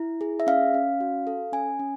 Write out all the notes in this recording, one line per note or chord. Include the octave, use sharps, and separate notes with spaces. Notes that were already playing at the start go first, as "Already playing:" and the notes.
Already playing: E4
G#4
E5
C#4 F5
C#4
F#4
A4
C#4 G#5
C#4